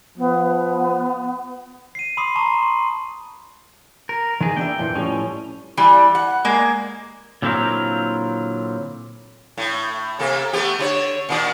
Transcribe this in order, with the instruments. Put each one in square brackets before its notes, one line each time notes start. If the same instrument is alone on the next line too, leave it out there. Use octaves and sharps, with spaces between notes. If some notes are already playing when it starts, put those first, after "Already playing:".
[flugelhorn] F3 [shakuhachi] B3
[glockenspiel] C7 D#7
B5 C6 D6 D#6 C7
A5 A#5 C#6 D#6
C6
[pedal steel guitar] A#4
[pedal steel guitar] D#3 G#4 [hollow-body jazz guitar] E3
[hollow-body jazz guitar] A#3 D4 E5 [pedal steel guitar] G5
[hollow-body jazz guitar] F2 A#2 E3
[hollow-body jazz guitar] A2 F3 G3 [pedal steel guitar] C#4
[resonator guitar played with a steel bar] E3 G3
F#5
G#3 A#3
[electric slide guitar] A#2 D3 F#3 C4 E4 A#4
[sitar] A2
C3 A#3 A4
A3 B3 G4
D3 F#4 C#5
A#2 D#3 D5